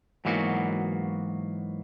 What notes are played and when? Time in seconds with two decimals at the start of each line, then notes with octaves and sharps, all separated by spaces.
0.25 G#2 E3 F#3 A#3 B3 F#4